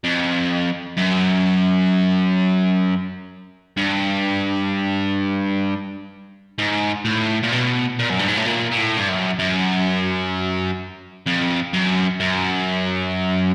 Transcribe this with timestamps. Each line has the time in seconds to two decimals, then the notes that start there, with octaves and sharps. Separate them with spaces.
0.04 F2
0.97 F#2
3.77 G2
6.58 G#2
7.05 A2
7.44 A#2
7.52 B2
7.99 A#2
8.10 F#2
8.19 G2
8.28 G#2
8.37 A2
8.45 A#2
8.71 A#2
8.77 A2
8.97 G2
9.08 F#2
9.39 F#2
11.26 F2
11.74 F#2
12.20 F#2